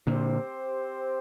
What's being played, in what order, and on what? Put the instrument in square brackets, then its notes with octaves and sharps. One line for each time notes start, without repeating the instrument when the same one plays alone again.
[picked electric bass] A#2 D3 [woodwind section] C4 G4 C5